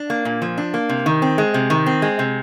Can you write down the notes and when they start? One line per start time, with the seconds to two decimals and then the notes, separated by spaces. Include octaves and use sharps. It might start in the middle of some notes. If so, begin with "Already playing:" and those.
Already playing: D4
0.10 A#3
0.25 A#2
0.42 F3
0.58 D4
0.74 A#3
0.89 C3
1.06 D#3
1.22 C4
1.38 G#3
1.54 C3
1.70 D#3
1.86 C4
2.02 G#3
2.19 C3